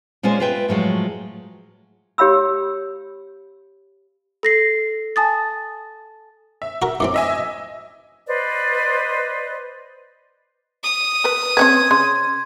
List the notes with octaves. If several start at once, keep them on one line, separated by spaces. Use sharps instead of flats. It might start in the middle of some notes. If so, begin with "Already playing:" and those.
A#2 G#3 C#4 F4 C5 G#5
F4 B4 E5 G5
A2 F3 F#3 G#3
G4 C#5 F5 B5 E6
A4 A#6 C7
G#5 A5 D#6 A6
E5
F#4 A#4
F#2 E3 C4 D6
D#5 E5 G#5
B4 C5 D5 D#5
D#6
A#4 B4
C4 C#4 B4 G#6
C#3 C6